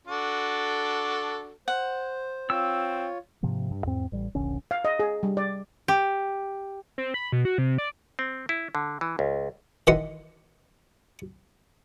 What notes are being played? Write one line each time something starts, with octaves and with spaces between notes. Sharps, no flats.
D4 F#4 A4
C5 F#5
C4 F4 C#5 E6
G#2 C3 F3 A#3
G2
E2 G#2 C4
A1 G3
D#1 A#1 D3 C#4
F5
D#5
G#4
G3
D5
G4
C4
B5
B2
F#4
C3
D5
C4
E4
D3
E3
C#2
D#3 E3 F#5 C6